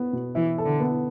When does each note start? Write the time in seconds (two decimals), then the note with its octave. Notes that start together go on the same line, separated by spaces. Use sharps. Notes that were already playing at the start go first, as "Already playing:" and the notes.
Already playing: B3
0.13 B2
0.35 E3 E4
0.58 A4
0.66 D3
0.80 B3